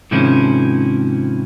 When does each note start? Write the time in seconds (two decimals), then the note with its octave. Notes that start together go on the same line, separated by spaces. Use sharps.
0.11 G#2 C3 D#3 F3 C#4 E4